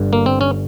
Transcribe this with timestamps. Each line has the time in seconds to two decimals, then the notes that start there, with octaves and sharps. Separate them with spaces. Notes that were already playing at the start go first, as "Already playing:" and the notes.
Already playing: G1 G2 D3
0.13 A#3
0.26 C4
0.41 C#4